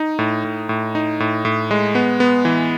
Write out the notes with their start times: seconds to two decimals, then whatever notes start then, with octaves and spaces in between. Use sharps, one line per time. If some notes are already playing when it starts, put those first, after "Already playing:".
Already playing: D#4
0.19 A2
0.44 A2
0.69 A2
0.95 D#4
1.20 A2
1.45 A2
1.71 G#3
1.95 B3
2.20 B3
2.45 E3